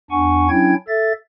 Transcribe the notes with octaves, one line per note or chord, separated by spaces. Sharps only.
E2 D4 F#5 G#5 C#6
F#3 C#4 D4 E4 G5 G#6
A4 E5 A6